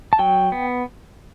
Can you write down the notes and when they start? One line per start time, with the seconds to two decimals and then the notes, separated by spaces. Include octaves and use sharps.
0.13 A5
0.19 F#3 G5
0.52 B3